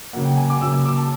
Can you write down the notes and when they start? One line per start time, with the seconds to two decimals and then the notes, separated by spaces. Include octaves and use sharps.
0.13 C#3 F#3 A#3 F#5
0.25 G5
0.37 G#5
0.50 D6
0.61 C#3 F#3 A#3 E6
0.73 E6
0.85 D6
0.97 A5